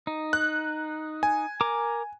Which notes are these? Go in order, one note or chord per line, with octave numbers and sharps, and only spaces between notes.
D#4
F#6
G#5
A#4 A#5 D6